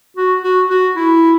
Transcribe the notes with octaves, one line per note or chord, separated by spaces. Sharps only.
F#4
F#4
F#4
E4